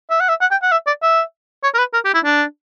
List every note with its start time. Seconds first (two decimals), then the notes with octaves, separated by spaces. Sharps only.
0.11 E5
0.20 F#5
0.29 E5
0.41 F#5
0.51 G5
0.63 F#5
0.72 E5
0.87 D5
1.03 E5
1.63 C#5
1.74 A#4
1.79 B4
1.94 A#4
2.05 G4
2.14 E4
2.25 D4